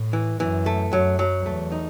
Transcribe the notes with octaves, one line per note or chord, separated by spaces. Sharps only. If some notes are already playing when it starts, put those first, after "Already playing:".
Already playing: A2
E3
F#2 E3
A3
F#2 F#3
F#3
E2 A3
D#4